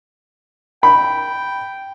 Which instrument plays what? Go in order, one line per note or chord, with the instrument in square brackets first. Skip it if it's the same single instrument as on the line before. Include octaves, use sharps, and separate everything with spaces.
[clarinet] G5 [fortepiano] B5